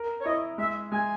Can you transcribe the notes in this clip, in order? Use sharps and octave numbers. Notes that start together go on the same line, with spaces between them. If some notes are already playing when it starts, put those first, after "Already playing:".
Already playing: A#4
C#5
E4 D#5
G#3 E5
G#3 G#5